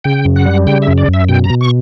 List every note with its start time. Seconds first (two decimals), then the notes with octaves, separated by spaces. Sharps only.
0.04 C#3 G5
0.25 F#2
0.36 F#5
0.46 G3
0.66 C#3 G5
0.82 E5
0.88 F#2
0.98 D5
1.08 F#2
1.14 E5
1.29 B2 G5
1.44 A#5
1.50 B2
1.61 C#6